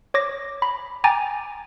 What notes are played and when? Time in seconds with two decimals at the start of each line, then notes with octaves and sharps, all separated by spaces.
0.14 C#5 D6 A#6
0.62 B5
1.04 G5 G#5 A#5 D6 A6